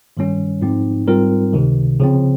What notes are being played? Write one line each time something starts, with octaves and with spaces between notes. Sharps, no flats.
G2 D#3 G3 C#4
G#2 F3 C4 D#4
G#2 G3 C4 F4 A#4
C#2 C3 D#3
C#3 F3 C4